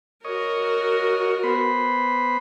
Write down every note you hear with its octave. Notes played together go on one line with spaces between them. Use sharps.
F#4 A#4 C#5 D#5
B3 C5 B5